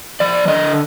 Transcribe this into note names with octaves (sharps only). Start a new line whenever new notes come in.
F3 D5
D3 D#5